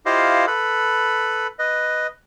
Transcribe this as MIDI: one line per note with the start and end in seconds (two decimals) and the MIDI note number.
0.06 0.46 64
0.06 0.46 65
0.06 0.46 67
0.06 0.46 72
0.06 0.46 75
0.06 0.46 77
0.47 1.47 69
0.47 1.47 71
0.47 1.47 83
1.59 2.07 71
1.59 2.07 75